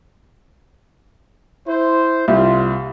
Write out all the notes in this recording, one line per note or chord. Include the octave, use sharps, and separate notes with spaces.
E4 C5
C2 F4